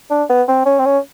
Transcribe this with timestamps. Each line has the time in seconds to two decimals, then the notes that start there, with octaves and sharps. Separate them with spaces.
0.10 D4
0.29 B3
0.48 C4
0.66 C#4
0.79 C4
0.85 C#4